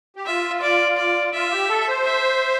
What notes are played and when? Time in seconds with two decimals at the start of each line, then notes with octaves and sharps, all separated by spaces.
0.16 G4
0.26 F4 E5
0.62 D5
0.98 D5
1.34 F4 E5
1.51 G4
1.69 A4
1.88 C5
2.05 E5